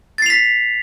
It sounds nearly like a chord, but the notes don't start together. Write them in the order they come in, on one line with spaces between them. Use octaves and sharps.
A6 C7 F7 B6